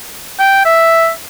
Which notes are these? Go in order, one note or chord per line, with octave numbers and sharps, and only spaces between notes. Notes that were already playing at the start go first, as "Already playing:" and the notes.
G5
E5